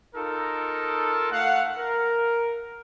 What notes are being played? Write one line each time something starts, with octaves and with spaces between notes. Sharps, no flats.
D#4 F4 A4 A#4
A3 F5 F#5
A#4